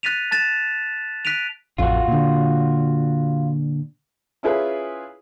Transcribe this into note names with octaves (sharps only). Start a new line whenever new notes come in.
F#6 A6 B6 D#7 F7
A5 F#6 A6 E7
F#6 B6 D7 D#7 F7
A1 F2 F4 F#4
A#2 D3
C#4 E4 F4 G#4 B4